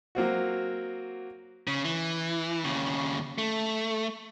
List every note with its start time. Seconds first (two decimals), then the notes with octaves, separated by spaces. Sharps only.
0.15 F#3 A#3 C4 F#4
1.67 C#3
1.85 E3
2.64 D#2 C#3
3.38 A3